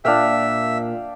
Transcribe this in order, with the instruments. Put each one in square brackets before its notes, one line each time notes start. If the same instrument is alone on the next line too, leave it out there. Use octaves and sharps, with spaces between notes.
[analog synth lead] A#2 [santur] D4 F5 G5 [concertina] E5